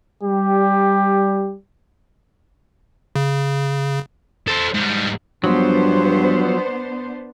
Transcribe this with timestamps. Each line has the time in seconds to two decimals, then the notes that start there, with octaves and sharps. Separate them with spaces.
0.23 G3 G4
3.16 C#3
4.48 A4 C5
4.74 G#2 G3
5.44 G2 F3 F#3 B3 D4 C5